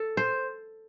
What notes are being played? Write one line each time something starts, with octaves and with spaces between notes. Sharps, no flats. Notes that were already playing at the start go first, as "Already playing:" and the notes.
Already playing: A4
C5